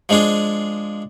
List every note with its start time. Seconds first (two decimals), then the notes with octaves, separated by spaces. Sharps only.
0.09 F3 G#3 D4 F4 G#4